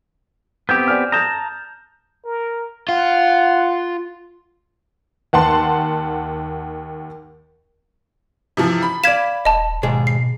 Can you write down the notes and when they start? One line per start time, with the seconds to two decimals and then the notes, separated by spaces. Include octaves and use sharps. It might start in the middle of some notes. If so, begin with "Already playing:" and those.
0.69 B3 C4 G4 G6
0.88 D5 G#5 F6
1.12 A5 A#5 D#6 G6
2.24 A#4
2.89 F4 F#5
5.33 D#2 F#5 A5 C6
8.57 C3 E3 F3
8.82 B5
9.04 D5 F5 G#6 B6 E7
9.45 D#1 D#5 A5
9.83 D#2 G#2 B2 G#4
10.07 C7